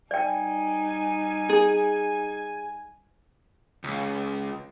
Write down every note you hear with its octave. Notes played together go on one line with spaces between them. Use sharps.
G3 D#4 D5 G5 G#5
G#4
C#2